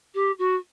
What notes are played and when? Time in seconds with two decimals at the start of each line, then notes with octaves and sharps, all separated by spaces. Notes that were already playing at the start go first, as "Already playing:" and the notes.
0.14 G4
0.38 F#4